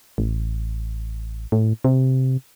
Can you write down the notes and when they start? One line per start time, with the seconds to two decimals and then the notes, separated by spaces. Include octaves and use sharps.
0.18 A1
1.52 A2
1.84 C3